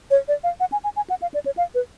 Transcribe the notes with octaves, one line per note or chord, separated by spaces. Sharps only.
C#5
D5
F5
F#5
G#5
G#5
G#5
F#5
F5
D5
C#5
F5
B4